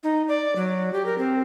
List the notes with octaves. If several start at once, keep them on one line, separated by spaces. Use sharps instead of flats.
D#4
D5
F#3
G4
A#4
C4